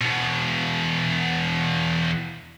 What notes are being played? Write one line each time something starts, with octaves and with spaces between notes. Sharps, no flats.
E2 B2